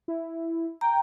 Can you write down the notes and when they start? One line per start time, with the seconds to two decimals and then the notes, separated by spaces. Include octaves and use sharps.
0.08 E4
0.81 G5 A#5